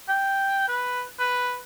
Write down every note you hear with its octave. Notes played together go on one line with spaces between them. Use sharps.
G5
B4
B4